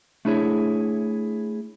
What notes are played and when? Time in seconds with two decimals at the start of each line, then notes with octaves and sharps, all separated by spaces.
0.25 A3 D4 E4 G#4 C#5